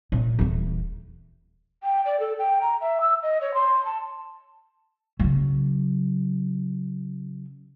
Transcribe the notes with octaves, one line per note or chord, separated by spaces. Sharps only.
A#2
D#1 E3
G5
D5
A4
G5
A#5
E5
E6
D#5
C#5
C6
A5
C#3 F#3